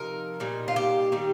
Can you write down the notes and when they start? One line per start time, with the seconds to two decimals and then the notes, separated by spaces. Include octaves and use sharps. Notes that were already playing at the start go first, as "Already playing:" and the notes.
Already playing: C3 F3 D#4 A#4
0.40 A#2 G3 D#4
0.68 F4
0.76 G4
1.12 D#3 G3 D#4